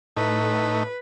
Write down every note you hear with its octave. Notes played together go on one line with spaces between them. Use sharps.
A2 A3 D#4 B4